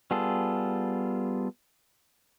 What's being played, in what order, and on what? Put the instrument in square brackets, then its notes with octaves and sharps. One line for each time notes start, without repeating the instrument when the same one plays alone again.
[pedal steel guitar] G3 B3 F4 G#4 A4